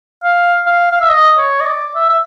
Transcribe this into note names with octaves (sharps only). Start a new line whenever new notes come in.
F5
F5
F5
E5
D#5
C#5
D#5
D5
E5
E5